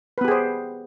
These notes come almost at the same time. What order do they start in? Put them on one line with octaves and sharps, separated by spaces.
B4 B3 G4 G#4 C5